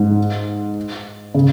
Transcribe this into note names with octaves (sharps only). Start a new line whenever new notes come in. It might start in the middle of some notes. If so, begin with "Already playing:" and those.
Already playing: G#2
C#3